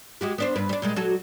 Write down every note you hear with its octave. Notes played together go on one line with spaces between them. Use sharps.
G#3 F#4 G4
B3 D4 C5
G2 B4
G3 D4
A#2 G3 G#3
F#3 F#4 A4